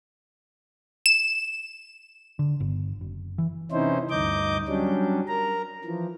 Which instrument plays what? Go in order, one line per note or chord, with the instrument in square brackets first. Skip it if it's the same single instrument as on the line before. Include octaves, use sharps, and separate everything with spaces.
[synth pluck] E7
[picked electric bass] D3
G1
F#1
E3
[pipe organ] C3 E3 C#4 D#4 E4 C5
D2 G2 D#4 D#5 D6 G6
F#3 G3 C#4 D4
A#4 A#5
E3 F3